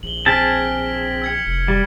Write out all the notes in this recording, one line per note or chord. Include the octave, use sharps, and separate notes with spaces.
A#1 F#7 G7
C4 G#4 A5 F6 B6 D7
E6 G#6 C#7
F1
G3